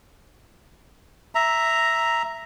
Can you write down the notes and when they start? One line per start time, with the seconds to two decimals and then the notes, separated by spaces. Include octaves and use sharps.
1.35 E5 A#5